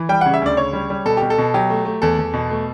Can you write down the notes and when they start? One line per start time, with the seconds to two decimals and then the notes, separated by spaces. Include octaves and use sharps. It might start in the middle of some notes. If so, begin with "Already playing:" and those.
Already playing: E3
0.09 G3 G5
0.21 C#3 F#5
0.34 E5
0.41 D2 D5
0.57 C#3 C#5
0.73 G3
0.90 G3
1.05 B2 A4
1.17 B2 G4
1.30 A4
1.38 B2
1.54 F#3 G4
1.70 A3
1.85 A3
2.02 E2 A4
2.18 E2
2.33 B2
2.50 A3